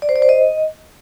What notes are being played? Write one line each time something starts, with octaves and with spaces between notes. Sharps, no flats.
D5
C5
D5
C5
D#5